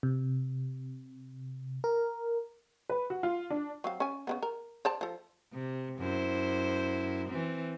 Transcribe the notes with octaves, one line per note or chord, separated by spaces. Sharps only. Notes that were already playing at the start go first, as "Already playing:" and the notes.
C3
A#4
B4
F#4
F4
D4
F#3 C4 F5
C#4 G#5
C#3 G#3 B3
A#4
C5 D5 A5
F3 A4
C3
F#2 E4 C5
E3 C4